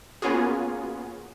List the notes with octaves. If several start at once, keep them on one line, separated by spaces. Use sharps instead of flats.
A#3 B3 C#4 F4 F#4 G#4